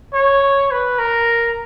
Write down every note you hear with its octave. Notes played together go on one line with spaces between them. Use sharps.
C#5
B4
A#4